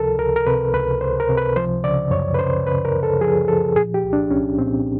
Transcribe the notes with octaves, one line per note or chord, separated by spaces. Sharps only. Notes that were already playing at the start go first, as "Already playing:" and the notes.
Already playing: C#2 C3 F3 A4 A#4
C#2 A#4
A#4
C3 B4
C#2 B4
C#2 C5
A#4
C3
B4
F3 C5
C#3 D5
F#2 C#5
B4
C#3 C5
C#3 B4
A#4
C#3
A4
F3 G#4
F3 A4
A#2 G#4
G4
C2
D4
C2 C#4
A#2 C4